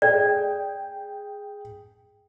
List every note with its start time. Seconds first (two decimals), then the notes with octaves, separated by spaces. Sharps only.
0.02 G#4 D5 G5